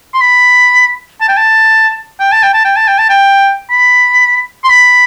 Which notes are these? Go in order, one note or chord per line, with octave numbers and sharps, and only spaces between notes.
C6
B5
A5
G5
A5
G5
A5
G5
A5
G5
A5
G5
A5
G5
B5
C6
B5